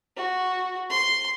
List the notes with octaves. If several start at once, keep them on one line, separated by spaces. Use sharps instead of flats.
F#4
C6